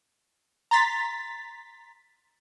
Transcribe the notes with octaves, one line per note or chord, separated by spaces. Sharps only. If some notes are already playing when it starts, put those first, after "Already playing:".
A#5 C6 A6 B6